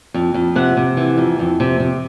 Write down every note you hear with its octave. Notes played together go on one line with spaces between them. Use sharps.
F2
F2
C3 F#5
C3
E3
F2
F2
C3
C3